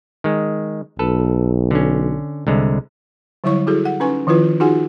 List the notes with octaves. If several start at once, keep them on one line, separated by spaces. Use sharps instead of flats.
D#3 G#3
B1 A4 B4
D3 C#4
C2 D3 G#3
D3 F#3 G3 E4 C#5 C#6
E4 F#4 G#4 A4
F#5
C#4 D#4 B4 G#5 C#6
D#3 F3 E4 F4 B4
D#4 F4 F#4 G#4 F#5 G#5